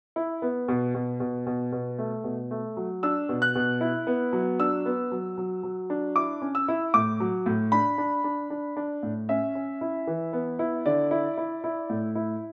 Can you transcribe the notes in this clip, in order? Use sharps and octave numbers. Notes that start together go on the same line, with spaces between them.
E4
B3
B2
B2
B2
B2
B2
A3
B2
A3
F#3
D4 E6
B2
F#6
B2
E4
B3
F#3
D4 E6
B3
F#3
F#3
F#3
D4
E4 D6
C#4
E6
E4
A2 D6
F#3
A2
D4 B5
D4
D4
D4
D4
A2
C#4 E5
C#4
E4
E3
B3
E4
D3 D5
E4
E4
E4
A2
E4